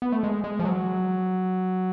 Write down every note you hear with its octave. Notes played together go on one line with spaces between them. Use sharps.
B3
A3
G#3
G#3
F3
F#3